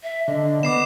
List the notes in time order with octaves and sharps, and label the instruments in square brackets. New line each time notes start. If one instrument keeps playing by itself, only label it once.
[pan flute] E5
[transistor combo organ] D3 [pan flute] D#5
[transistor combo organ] B3 [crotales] D6 C7 E7